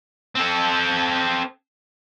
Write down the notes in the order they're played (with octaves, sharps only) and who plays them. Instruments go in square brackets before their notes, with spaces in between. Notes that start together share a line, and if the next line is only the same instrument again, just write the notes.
[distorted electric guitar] C4 A4